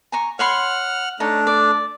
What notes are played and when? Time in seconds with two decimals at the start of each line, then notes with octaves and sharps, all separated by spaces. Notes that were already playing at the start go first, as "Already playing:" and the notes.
0.12 G#5 A#5 C#6
0.39 C#5 F#5 B5 C6 F6
1.20 A3 D4 D#4 C#5 A5
1.47 D5